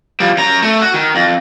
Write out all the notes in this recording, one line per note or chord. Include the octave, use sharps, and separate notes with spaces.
F3 G3
F#2 A#5
A3
F#4
D#3
F2